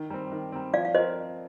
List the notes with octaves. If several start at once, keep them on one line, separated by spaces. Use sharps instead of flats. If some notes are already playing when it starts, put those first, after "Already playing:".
Already playing: D#3
G3 C4
D#3
G3 C4
F3 D5 F5
F5
C4 F4 A#4 C5 D#5